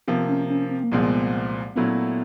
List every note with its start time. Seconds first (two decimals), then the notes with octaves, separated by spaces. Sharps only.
0.08 C3 F3 A#3 B3
0.28 C#4
0.49 C#4
0.70 C4
0.84 A#3
0.92 C2 A#2 F3 G#3 B3 C4
1.75 A#2 F#3 A3 B3 C#4 E4